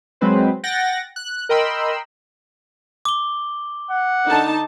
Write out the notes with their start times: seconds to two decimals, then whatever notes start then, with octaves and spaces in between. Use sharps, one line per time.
0.21 F#3 G#3 C4 B4 C5
0.64 F#5 G5 A6 A#6
1.16 F#6
1.49 A#4 D#5 G5 B5 C6 E6
3.05 D6 G7
3.91 F#5
4.27 D3 D#4 A5